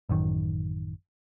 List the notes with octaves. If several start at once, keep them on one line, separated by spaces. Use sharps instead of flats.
A1 F#2 D#3